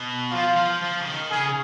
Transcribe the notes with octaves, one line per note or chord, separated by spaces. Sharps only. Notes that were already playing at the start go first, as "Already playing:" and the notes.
Already playing: B2
F3 F4
F3
F3
C#3
D#3
C#3 G#4